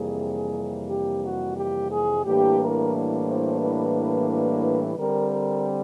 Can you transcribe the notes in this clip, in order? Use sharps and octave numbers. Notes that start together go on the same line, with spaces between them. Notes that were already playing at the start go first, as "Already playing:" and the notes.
Already playing: F2 C3 E3 G3 A#3 G#4
G4
F#4
G4
G#4
A2 E3 G3 A#3 D4 G4
A#4
C5
B4
D3 G3 C4 A#4
A#4